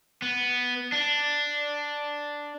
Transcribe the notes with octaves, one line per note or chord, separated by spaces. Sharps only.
B3
D4